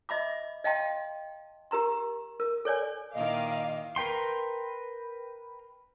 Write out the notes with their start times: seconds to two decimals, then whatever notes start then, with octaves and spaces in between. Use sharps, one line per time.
0.09 D#5 E5 B5 D6
0.64 D#5 F5 G5 A5 C6
1.71 G4 A#4 A#5 C6
2.40 A#4
2.65 A4 C#5 D5 G#5
3.14 A#2 D#3 E4 D#5 F5 D6
3.96 A#4 B4 G5 C6